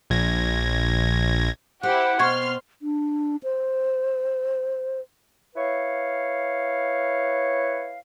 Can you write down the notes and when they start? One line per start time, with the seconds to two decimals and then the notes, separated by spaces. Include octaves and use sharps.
0.10 A#1 G#6 A#6
1.83 E4 G4 C5 F#5
2.19 B2 B3 C4 C6 C#6 F6 G#6
2.82 D4
3.43 C5
5.55 E4 B4 C#5 F5